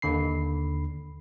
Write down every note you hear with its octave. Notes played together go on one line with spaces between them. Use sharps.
D#2 D3 B5 C7